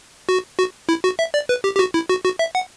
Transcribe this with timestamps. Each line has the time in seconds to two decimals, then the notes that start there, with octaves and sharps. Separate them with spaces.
0.29 F#4
0.59 F#4
0.89 E4
1.04 F#4
1.19 E5
1.34 D5
1.49 B4
1.64 G4
1.75 G4
1.79 F#4
1.94 E4
2.09 F#4
2.24 F#4
2.39 E5
2.55 F#5